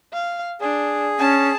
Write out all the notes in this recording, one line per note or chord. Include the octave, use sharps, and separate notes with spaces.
F5
D4 G#4
C#4 A5